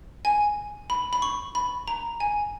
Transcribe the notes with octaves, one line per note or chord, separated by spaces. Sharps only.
G#5
B5
B5
C#6
B5
A#5
G#5